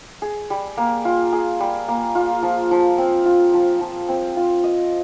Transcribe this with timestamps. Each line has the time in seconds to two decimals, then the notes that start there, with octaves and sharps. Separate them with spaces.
0.22 G#4
0.50 G3
0.77 A#3
1.05 F4
1.33 G#4
1.60 G3
1.88 A#3
2.15 F4
2.43 F3
2.71 F3
2.98 C4
3.25 F4
3.54 F3
3.81 F3
4.09 C4
4.37 F4
4.63 D#5